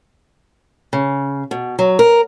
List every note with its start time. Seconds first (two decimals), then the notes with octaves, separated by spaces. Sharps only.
0.93 C#3
1.51 B2
1.79 F#3
1.99 A#4